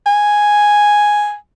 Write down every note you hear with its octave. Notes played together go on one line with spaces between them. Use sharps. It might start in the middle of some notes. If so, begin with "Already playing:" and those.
G#5